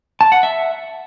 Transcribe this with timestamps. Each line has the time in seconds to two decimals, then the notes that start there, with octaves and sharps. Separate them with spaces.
0.21 A5
0.32 F#5
0.43 E5